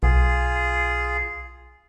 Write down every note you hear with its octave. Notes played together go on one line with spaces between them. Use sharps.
B1 F4 G#4